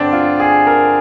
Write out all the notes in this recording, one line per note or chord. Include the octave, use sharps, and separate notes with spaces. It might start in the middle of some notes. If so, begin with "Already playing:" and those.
Already playing: G2 D3 C4 D4
F4
G#4
A#4